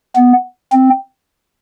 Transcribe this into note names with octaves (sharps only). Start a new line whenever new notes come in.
B3
C4